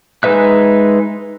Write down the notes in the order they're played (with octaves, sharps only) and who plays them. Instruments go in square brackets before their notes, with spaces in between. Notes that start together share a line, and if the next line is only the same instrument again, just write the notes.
[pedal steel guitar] G#3 D#4 B4 E5 F#6